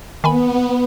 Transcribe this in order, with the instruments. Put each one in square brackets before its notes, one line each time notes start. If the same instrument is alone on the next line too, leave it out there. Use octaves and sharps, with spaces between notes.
[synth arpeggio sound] D#3 G#5 B5 [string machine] B3